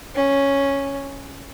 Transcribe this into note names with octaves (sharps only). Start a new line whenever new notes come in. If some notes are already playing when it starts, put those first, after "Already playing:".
C#4